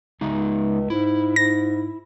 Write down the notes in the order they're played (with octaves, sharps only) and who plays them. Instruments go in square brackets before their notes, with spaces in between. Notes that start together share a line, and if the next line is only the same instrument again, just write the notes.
[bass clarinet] C#2 [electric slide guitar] C#3 G#3 D#4
[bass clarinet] G#2 [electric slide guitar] E4
[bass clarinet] G#2 [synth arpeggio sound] A#6